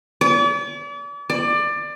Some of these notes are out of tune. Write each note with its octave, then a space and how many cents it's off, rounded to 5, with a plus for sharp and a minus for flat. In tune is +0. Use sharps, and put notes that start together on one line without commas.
D5 -40
D5 +20